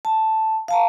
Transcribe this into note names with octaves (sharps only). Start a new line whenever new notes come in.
A5
F5 A5 A#5